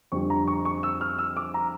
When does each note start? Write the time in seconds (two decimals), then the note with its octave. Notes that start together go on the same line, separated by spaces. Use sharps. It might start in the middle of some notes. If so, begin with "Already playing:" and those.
0.12 F2 D3 G3 C#6
0.30 A#5
0.47 C#6
0.65 C#6
0.83 E6
1.01 F6
1.19 E6
1.37 D6
1.54 A#5